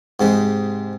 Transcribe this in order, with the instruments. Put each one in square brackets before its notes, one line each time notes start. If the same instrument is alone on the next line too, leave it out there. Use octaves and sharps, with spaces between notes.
[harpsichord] G#2 C3 G#3